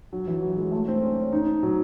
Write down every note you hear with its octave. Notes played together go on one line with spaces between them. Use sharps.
F#3
E3
F#3
G#3
A3
C4
C#4
C#4
D#4
F#3